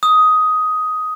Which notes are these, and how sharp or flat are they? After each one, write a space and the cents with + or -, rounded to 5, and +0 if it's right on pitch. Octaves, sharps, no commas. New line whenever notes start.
D#6 +10